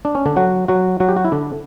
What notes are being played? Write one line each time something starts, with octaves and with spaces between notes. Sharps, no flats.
D4
C#4
D3 D4
F#3 F#4
F#3 F#4
F#3 F#4
G4
F#4
E4
D3 D4